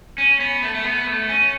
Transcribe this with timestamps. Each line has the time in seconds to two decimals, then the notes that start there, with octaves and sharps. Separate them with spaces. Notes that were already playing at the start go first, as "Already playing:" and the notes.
0.18 C#4
0.40 B3
0.63 A3
0.75 A3
0.85 B3
1.07 A3
1.29 C#4